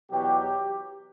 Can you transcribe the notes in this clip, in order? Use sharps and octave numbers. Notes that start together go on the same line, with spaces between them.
E2 B2 F#3 G4